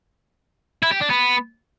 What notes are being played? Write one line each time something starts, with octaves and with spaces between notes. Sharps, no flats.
E4
G4
D4
B3